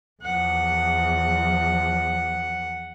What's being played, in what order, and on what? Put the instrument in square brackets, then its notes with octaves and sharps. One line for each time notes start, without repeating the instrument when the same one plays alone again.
[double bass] E2 F3 [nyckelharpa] F#5